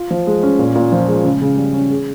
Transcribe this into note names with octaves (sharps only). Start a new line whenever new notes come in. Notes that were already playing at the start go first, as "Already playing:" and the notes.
Already playing: F4
F3
G#3
C#4
A#2
A#2
F3
G#3
C#3
C#3
G3
C#4
G#4